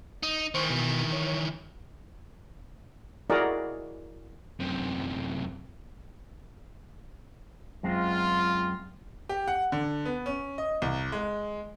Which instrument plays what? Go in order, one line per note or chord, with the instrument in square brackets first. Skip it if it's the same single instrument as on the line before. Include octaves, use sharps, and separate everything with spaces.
[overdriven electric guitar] D#4
[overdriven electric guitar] D#3 E3 [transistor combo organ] C5 C#6
[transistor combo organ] B2
C#5
[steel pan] E4 F#4 G#4 A#4 D5 D#5
[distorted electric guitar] F#2 C3
[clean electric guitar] F#2 G#3 C4 [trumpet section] F4
[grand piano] G4
F#5
D3
B3
C#4
D#5
C2
G#3